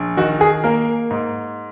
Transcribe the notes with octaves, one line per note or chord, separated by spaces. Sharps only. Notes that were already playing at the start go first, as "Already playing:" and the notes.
Already playing: A#1
D#3 F#4
G#4
A#3 A#4
G#2